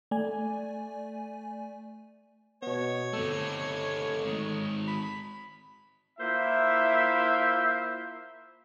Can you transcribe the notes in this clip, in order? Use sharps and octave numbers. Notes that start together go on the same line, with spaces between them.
A3 D5 G#5
B2 B3 C#5
G1 A3 C4 A4
G#2 D#3
B5
A#3 E4 F4 C5 E5